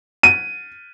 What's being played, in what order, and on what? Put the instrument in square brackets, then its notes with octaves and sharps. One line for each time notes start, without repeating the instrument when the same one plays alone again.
[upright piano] D#7